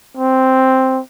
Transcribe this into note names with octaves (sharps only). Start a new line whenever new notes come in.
C4